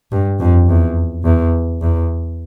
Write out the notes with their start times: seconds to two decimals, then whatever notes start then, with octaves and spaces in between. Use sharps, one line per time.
0.12 G2
0.40 F2
0.68 E2
1.24 E2
1.81 E2